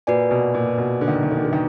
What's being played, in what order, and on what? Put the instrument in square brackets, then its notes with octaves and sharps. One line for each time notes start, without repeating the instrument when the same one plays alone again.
[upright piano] A#2 [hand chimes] F#4 B4 D5 G#5
[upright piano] B2
A#2
B2
D3
D#3
D3
D#3
D3
D#3
D3
D#3